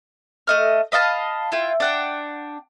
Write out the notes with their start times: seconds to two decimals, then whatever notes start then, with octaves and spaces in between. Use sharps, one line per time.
0.47 A3 D#5 F6
0.92 B4 D#5 F5 A5
1.52 E4 F4 G5
1.80 D4 F#5 G5